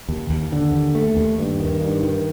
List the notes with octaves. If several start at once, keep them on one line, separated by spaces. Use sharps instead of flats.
D#2
D#2
D3
D#2
A3
D#2
G2
D#3
G2
D#3